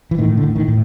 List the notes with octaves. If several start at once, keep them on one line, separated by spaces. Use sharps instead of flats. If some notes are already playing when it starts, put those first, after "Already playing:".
E3
A2 D#3
D3
A2
D#3
A2